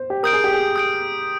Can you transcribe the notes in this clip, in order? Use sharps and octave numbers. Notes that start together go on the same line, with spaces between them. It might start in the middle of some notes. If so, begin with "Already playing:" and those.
Already playing: C5
G4
A#4 D#6 G6 D7
G#4
G4
G#4
D#6 G6 D7